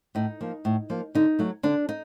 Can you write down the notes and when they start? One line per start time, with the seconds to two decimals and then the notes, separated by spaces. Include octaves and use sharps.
0.15 A2 D#4
0.41 F3 A#3
0.65 A2
0.90 F3 A#3
1.15 D3 D#4
1.39 F#3 A3
1.63 D3 D4
1.89 D#4